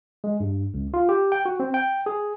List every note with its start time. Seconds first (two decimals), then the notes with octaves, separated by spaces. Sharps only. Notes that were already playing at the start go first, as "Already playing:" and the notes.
0.24 G#3
0.40 G2
0.74 C#2
0.94 F4
1.09 G4
1.32 G5
1.46 F#4
1.60 C4
1.74 G5
2.06 G#4